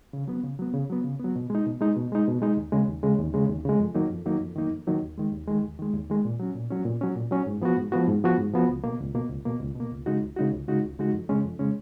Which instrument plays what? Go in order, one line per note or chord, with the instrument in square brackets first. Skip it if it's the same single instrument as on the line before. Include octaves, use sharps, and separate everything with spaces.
[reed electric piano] C#3
F#3 B3
C#3
F#3 B3
C#3
F#3 B3
C#3
F#3 B3
B2
G#3 D#4
B2
G#3 D#4
B2
G#3 D#4
B2
G#3 D#4
D#2
C#3 G#3
D#2
C#3 G#3
D#2
C#3 G#3
D#2
C#3 G#3
F2
D#3 F#3 A#3 D#4
F2
D#3 F#3 A#3 D#4
F2
D#3 F#3 A#3 D#4
F2
D#3 F#3 A#3 D#4
D#2
D#3 G#3
D#2
D#3 G#3
D#2
D#3 G#3
D#2
D#3 G#3
A#2
F#3 C#4
A#2
F#3 C#4
A#2
F#3 C#4
A#2
F#3 C#4
G#2
F3 B3 F#4
G#2
F3 B3 F#4
G#2
F3 B3 F#4
G#2
F3 B3 F#4
C#2
B2 A#3
C#2
B2 A#3
C#2
B2 A#3
C#2
B2 A#3
C#2
C#3 G#3 D#4 F#4
C#2
C#3 G#3 D#4 F#4
C#2
C#3 G#3 D#4 F#4
C#2
C#3 G#3 D#4 F#4
F2
C#3 G#3 C#4
F2
C#3 G#3 C#4